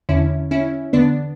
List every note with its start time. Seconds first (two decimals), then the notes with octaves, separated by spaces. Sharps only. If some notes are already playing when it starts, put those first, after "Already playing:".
0.09 E2 D3 C#4 E4
0.51 C#4 E4
0.93 E2 D3 B3 D4